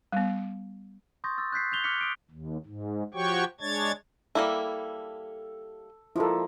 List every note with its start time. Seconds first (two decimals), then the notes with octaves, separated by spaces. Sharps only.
0.12 G3 B3
1.24 C6 C#6 D#6 G6 A6 A#6
1.38 D#6 E6 A6
1.52 F#6 G6 B6 C7
1.72 F#6 G6 F7 G7
1.84 D6 F6 F#6 B6 C#7
2.01 D#6 D7
2.31 D#2
2.66 G#2
3.14 F3 F#4 G4 C#5 G5 C#6
3.61 G#3 D4 C#5 G#6 A6
4.35 G3 A#3 E4 A4
6.16 F3 G#3 A#3 E4 A4